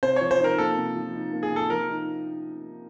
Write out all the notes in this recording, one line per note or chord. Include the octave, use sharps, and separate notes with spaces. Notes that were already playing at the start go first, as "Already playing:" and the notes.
C3 C5
F3 C#5
C5
D#4 A#4
A#3 A4
C3
F3
D#4
A#3
G#4
C3
A4
F3 A#4
D#4